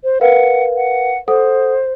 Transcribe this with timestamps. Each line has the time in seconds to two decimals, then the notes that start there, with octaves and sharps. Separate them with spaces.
0.04 C5
0.21 A#4 B4 F5 F#5
0.76 F#5
1.28 A4 C5 F#5 D#6